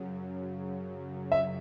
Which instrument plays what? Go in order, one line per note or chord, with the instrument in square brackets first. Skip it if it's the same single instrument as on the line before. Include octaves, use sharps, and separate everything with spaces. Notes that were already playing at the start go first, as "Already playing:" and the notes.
Already playing: [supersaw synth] F#2 C#3 F#3
[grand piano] E5